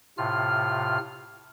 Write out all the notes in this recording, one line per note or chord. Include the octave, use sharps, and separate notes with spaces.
A2 C3 F4 F6